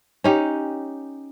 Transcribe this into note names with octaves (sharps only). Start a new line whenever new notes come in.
C#4 D#4 G4